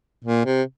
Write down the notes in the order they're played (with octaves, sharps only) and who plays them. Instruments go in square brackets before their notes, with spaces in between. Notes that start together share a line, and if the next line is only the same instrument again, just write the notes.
[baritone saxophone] A#2
C3